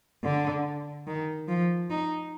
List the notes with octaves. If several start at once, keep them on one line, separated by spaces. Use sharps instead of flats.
D3
D#3
F3
D#4